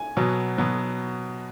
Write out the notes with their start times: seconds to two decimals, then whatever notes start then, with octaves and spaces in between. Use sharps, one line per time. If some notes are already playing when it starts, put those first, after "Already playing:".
Already playing: G#5
0.17 B2 F#3 B3
0.58 B2 F#3 B3